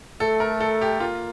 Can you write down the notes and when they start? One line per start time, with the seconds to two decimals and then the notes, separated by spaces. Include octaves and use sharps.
0.20 A3 A4
0.40 A#4
0.60 A4
0.81 G4
1.00 A#3 F4